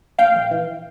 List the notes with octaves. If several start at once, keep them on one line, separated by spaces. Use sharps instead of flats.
A#1 F5 G5
A#1
E3